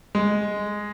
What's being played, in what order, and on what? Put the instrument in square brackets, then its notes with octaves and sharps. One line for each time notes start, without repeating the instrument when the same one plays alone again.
[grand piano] G#3